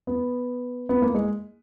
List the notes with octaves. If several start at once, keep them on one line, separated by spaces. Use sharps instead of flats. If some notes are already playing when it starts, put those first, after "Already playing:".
B3
B3
A#3
G#3